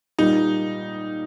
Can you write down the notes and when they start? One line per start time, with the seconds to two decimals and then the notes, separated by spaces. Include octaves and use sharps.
0.19 A#2 G3 A#3 D#4